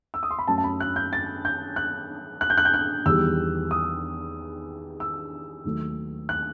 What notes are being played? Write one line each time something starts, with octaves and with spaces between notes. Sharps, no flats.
E6
D#6
C6
B5
F#2 F#3 A3 A5
A5
B5
F#6
G6
A6
G6
F#6
F#6
G6
F#6
G6
F#6
E2 D#3 G3 E6
D#6
E6
D#2 D#3 F#3 A3
F#6